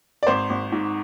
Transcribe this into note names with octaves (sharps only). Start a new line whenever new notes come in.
D5
G#1 C5
G#1
G#2